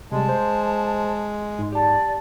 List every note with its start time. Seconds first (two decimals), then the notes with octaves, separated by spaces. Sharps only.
0.12 C3 G3 G#3 A5
0.29 C5
1.59 G#2
1.72 G4 D5 A5